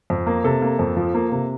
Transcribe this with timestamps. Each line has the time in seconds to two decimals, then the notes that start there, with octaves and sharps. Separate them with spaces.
0.10 F2
0.27 A#3
0.44 C3 A4
0.62 A#3
0.79 F2
0.97 F3
1.14 A#3
1.32 C3